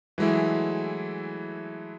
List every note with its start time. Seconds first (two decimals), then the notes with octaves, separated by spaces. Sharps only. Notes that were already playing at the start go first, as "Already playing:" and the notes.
0.18 E3 F#3 G#3 A3 E4